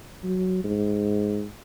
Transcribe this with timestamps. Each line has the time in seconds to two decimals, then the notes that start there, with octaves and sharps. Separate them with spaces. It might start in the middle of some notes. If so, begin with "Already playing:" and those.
0.24 F#3
0.64 G#2